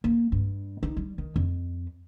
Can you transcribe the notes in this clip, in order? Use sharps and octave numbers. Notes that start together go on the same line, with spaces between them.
A#3
G2
D#4
G3
D#3
F2